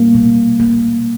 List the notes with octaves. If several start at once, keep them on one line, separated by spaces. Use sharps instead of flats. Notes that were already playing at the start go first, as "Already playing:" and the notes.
Already playing: G3 A#3
B2
A#3